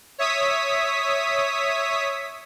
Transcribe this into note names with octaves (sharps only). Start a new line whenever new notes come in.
C#5 E5 D#6 B6